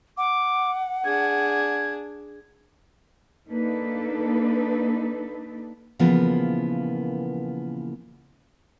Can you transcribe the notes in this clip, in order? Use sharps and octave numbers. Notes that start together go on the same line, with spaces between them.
F#5 D6
D4 G#4 G#6
A#3 D4 D#4 A4 B4
A#2 C#3 E3 F3 A#3 B3